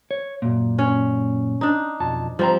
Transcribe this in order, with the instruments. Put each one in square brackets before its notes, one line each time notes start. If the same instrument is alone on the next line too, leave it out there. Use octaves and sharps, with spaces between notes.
[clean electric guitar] C#5
F#2 A#2
[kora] C#4
D4 D#4
[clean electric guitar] B1 F2 A5
[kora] F3 C4 [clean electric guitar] G3 A#5